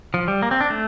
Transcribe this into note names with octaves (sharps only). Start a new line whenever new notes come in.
F3
G3
A#3
C4
D4
A3